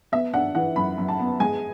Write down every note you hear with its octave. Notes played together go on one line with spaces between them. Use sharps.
B3 E5
D4 F#5
E3 F#5
F#2 B5
F#2
A5
B3
G#3 G#5